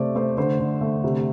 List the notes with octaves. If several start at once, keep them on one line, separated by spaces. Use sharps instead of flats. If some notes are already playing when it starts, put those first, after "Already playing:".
Already playing: C3 A3 C5 D5
A3 C5
D3 C5
D3
A3
C3